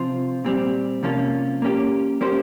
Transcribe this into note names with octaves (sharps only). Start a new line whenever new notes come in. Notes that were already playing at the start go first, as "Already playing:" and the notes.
Already playing: C3 F3 C4 F4 C5
A#2 G3 C4 G4
C3 F3 A#3 C#4 F4
A#3 C#4 G4
A#3 C#4 G4 C5